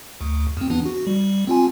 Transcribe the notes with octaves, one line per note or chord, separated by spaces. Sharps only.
D2
E2 C4
E3 B3 D4
F#4
G3
C4 F4 G#5